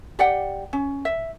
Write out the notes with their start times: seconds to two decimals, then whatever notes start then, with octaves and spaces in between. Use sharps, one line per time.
0.19 G4 D5 F#5 G5
0.73 C#4
1.05 E5